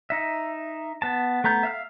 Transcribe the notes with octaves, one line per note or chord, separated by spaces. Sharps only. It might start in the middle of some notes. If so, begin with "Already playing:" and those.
D#4 E5
B3 A5
A3 B3 A#5 G6
E5 F5 F6